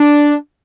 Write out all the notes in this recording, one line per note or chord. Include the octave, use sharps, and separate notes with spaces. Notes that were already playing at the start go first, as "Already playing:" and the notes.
Already playing: D4